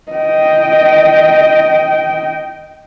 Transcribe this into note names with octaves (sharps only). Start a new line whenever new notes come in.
D#5 G5